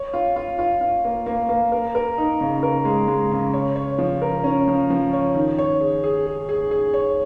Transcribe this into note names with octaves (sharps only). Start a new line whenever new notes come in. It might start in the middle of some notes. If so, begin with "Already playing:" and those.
Already playing: C#5
F4
F4
F4
F4
A#3
A#3
A#3
A#4
A#4
D#4
C#3
A#4
G#3
G#3
C#3
C#5
C#5
F3
A#4
C#4
F3
F3
C#5
D#3
C#5
G#4
G#4
G#4
G#4
G#4
C#5